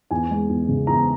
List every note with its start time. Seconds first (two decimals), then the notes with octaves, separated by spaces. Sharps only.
0.11 E2 G#5
0.31 G#3
0.50 E2
0.69 C#3
0.87 E2 A#5